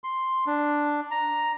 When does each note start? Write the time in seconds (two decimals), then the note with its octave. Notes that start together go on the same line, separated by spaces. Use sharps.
0.04 C6
0.47 D4
1.11 A#5